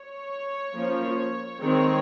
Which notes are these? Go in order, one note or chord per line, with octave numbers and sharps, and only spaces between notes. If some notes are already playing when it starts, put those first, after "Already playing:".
Already playing: C#5
F3 A#3 C#4
D#3 G#3 C4 C#5